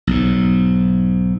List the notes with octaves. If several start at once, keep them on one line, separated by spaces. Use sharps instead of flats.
B1 G#2